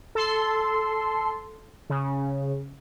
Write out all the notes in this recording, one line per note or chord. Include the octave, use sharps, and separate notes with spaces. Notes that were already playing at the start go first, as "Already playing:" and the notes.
A4 C6
C#3